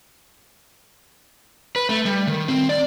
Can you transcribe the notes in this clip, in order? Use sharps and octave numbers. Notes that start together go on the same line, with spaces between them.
B4
A3
G3
D#3
C4
D5